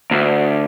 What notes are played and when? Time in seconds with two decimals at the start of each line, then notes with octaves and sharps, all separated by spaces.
0.11 D2